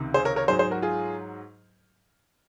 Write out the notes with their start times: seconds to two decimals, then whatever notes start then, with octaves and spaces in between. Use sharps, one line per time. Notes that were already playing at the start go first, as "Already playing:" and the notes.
Already playing: C#2 C3 D#3
0.14 G#4 C5
0.25 A#4 C#5
0.36 A#4 C#5
0.48 G#2 F#3 G#4 C5
0.59 G#4 C5
0.71 F#4 A#4
0.82 F4 G#4